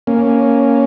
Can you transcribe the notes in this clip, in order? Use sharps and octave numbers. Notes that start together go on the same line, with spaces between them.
A#3 C#4